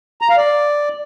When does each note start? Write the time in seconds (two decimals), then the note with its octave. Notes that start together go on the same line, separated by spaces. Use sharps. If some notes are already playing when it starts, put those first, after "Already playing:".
0.21 A#5
0.29 F5
0.37 D5